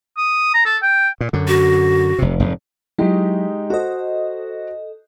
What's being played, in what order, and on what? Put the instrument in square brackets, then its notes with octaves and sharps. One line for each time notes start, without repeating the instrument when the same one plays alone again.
[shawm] D#6
A#5
A4
G5
[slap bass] A#2
F#2 D3
[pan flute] F#4
[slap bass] F1 C3
F1 G#2
[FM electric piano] F#3 E4 [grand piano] G#3 D#4 G4
[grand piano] F#4 C5 [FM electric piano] A4 D#5